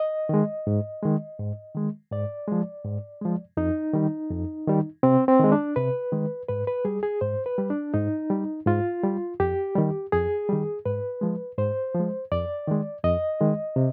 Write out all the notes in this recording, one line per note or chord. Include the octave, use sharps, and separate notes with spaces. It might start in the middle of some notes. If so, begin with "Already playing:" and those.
Already playing: D#5
D#3 G#3
G#2
D#3 G#3
G#2
D#3 G#3
G#2 D5
F3 G#3
G#2
F3 G#3
F2 D#4
D#3 G3
F2
D#3 G3
C3 C4
C4
D#3 G#3
D4
C3 B4
D#3 G#3
G#2 B4
B4
G3 G#4
G#4
G#2 C5
B4
G3
D4
G#2 D#4
G3
G#2 F4
G3
F2 G4
D#3 G3
F2 G#4
D#3 G3
G#2 B4
F3 G#3
G#2 C5
F3
G#3
F2 D5
D#3 G#3
F2 D#5
D#3 G#3
C3